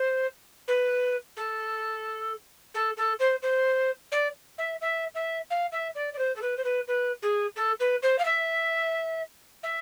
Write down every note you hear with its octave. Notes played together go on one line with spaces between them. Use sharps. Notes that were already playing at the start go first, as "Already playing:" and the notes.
Already playing: C5
B4
A4
A4
A4
C5
C5
D5
E5
E5
E5
F5
E5
D5
D5
C5
A4
B4
C5
B4
B4
G#4
A4
B4
C5
F5
E5
E5